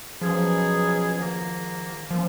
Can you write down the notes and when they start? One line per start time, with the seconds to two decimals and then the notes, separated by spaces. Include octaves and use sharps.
0.21 B2 F3 F#3 C#4 G#4
1.17 G#2 D#3 A#3
2.11 F3 F#3 A#3 C#4